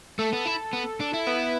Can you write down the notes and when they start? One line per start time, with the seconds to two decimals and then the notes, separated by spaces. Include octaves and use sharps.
0.19 A3 A4
0.33 B3
0.45 E4
0.73 B3
1.00 D4
1.14 E4
1.27 B3 B4